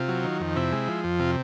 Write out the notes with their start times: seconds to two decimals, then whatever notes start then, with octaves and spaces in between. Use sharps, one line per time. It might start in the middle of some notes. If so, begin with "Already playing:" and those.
Already playing: C3 F4
0.08 F#3
0.24 D#3
0.40 F2
0.56 C3 E4
0.72 G#3
0.88 F3
1.04 F2
1.20 C3 F4